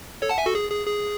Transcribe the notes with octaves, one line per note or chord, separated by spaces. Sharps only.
A4 C#5
F#5 A5
E5 G#5
F#4 A4
G#4
G#4
G#4